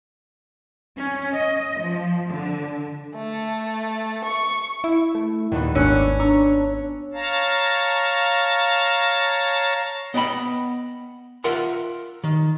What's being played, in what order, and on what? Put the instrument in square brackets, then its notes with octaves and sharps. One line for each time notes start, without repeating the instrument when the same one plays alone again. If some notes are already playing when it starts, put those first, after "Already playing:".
[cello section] C#4
D#5
F3
D3
[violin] A3
C#6
[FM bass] E4
[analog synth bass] A3
[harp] D#2 A3 B3 [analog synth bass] A#2
[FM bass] G#1 [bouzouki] C#4 [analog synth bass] D4 [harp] E6 F#6 C#7
[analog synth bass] D4 [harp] A#5 C#6 E6
[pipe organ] C#5 F5 A5 A#5
[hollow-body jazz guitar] B3 D#5 G5 B5
F4 A#4 E5 F#5 C6
D#3